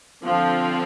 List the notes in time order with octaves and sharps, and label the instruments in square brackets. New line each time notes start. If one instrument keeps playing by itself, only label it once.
[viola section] D3 F3 C4 F4